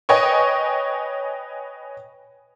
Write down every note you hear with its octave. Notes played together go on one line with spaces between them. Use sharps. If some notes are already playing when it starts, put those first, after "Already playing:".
B4 C#5 D#5 G5 G#5 C#6